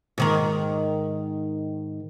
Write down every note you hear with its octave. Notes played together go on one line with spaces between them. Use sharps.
G#2 D#3 A#4